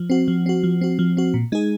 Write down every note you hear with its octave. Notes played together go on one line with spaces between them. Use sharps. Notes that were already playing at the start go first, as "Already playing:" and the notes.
Already playing: F3
C4 F#4
F3
C4 F#4
F3
C4 F#4
F3
C4 F#4
A#2
G#3 D#4 G#4